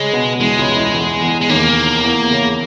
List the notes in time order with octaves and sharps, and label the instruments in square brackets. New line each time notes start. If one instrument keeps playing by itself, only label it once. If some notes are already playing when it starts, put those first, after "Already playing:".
Already playing: [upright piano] C#3 C#4 [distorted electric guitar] G#3
[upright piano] B2 B3
[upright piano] E2 E3 [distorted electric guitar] G#3
[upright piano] C#2 C#3
E2 E3
E2 E3
E2 E3
[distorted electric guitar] G#3
[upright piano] D#2 D#3 [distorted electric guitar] A#3
[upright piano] E2 E3
C#3 C#4